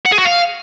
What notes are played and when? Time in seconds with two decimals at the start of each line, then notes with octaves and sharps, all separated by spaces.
0.05 F#5
0.12 G#4
0.19 F#4
0.25 F5